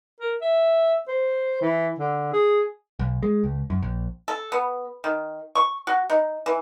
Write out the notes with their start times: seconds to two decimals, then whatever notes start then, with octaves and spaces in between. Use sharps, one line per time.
0.20 A#4
0.41 E5
1.08 C5
1.61 E3
1.99 D3
2.33 G#4
2.99 B1
3.23 G#3
3.44 C#2
3.70 F#2
3.82 A#1
4.28 A4
4.52 B3
5.04 D#3
5.55 C#6
5.87 F#4
6.10 D#4
6.46 E3